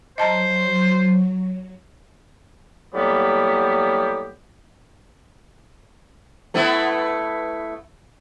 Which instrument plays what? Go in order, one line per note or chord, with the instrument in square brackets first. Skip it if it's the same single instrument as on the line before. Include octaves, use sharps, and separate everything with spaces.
[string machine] F#3 [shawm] C5 [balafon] D#5 A5 A#5
[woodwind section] A2 F#3 G3 A#3 B3 G4
[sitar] A3 B3 E4